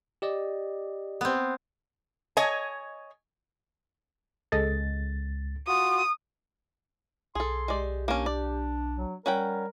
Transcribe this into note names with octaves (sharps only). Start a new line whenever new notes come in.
G4 D5 D#5
B3 C4
C#5 D#5 G#5
C#2 G#4 A4 D#5 A6
F4 F#4 D#6
B1 G#4 A4 C6
G#3 G4 D5
A#3 C#4 D4
D5
F#3
G3 C#4 A#4 F#5 G5